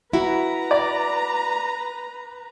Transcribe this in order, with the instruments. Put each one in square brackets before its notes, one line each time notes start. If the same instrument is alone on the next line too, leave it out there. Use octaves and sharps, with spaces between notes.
[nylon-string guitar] E4 F#4 [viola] B4 A#5
[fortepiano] D5